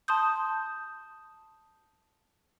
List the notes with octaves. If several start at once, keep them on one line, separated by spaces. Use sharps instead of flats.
A5 C6 D#6 G6